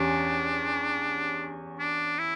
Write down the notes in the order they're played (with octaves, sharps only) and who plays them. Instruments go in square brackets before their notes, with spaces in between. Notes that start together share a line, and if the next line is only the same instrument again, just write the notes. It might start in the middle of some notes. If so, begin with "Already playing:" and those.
Already playing: [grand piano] E2 C#4 G4 [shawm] D4
[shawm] D4
E4